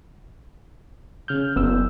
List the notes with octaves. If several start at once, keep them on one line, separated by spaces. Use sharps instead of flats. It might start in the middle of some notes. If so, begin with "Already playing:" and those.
C#3 F6 G6
F#1 B3 E6